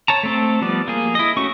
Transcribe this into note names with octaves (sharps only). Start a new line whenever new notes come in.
C#5 A5 A#5
A3 C4 A4
F3 G3 B3 D5
A#3 G#4
E4 D#5
A3 C#4 F#4 C#6